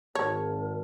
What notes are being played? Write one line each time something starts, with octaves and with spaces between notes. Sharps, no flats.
G#1 A#4 C#5 A5